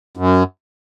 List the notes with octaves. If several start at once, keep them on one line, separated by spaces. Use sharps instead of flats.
F#2